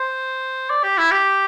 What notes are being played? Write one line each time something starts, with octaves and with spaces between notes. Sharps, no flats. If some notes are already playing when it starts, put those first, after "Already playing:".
Already playing: C5
D5
G4
E4
G4